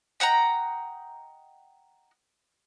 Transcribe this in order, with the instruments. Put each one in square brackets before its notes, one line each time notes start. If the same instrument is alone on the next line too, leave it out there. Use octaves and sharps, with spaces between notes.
[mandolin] D#5 F#5 G5 A#5